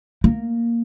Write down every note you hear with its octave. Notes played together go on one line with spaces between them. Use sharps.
A#3